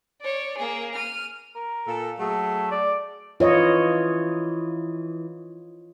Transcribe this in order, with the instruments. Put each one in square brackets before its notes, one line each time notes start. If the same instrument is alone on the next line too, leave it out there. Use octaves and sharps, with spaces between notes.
[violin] C#5 D5
A#3 G#4
F6 D#7
[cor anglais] A#4
[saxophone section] A#2 A4
[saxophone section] F#3 G#4 [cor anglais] A3
[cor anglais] D5
[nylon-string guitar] E3 [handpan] F4 C#5 D#5